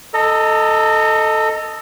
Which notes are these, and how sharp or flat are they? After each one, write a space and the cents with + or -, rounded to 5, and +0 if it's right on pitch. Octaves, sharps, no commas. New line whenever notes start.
A4 +0 D#5 +0 A#5 -30